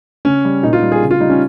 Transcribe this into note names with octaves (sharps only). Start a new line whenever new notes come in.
C#3 C#4
G3
A#2 D#4
F4
G3
G#4
C#3
F4
G3 D#4
C#4